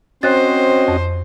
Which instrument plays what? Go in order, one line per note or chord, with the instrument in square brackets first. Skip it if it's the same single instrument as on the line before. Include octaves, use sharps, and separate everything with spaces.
[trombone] C4 [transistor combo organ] C#4 F#4 D#5 [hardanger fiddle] C5 [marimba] C#5 F#6 A6
[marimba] F2